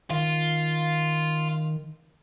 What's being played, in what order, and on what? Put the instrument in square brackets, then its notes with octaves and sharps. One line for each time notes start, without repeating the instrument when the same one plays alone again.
[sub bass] D#3 [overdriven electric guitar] F4